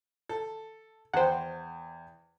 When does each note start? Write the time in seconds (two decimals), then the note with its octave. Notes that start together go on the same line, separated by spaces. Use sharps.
0.29 A4
1.14 E2 C5 F#5 G5